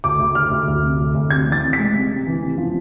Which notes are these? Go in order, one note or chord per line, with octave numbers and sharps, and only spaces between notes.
D2 D6
D2
D2 F6
D2
D2
C3
D2
D2
C3 G#6
E3
A6
C3
B6
G#3
C2
C3
E3
C3
F3